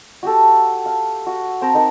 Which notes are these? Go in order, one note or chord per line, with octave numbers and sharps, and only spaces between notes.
F#4 G4 A4
F5
F#4
C4 G5 A5 A#5
D#4 A#4 F#5 C#6